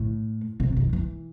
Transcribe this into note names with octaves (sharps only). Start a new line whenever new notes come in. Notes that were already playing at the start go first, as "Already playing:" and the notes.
Already playing: A2
C3
D#3
E3